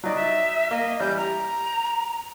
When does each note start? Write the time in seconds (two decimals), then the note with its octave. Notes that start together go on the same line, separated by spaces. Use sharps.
0.04 F#3 D#4 D5
0.16 E5
0.71 A#3 D#5
1.00 A1 G3 G6
1.17 G4 A#5